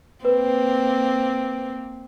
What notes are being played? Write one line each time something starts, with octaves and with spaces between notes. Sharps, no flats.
A#3 C4 B4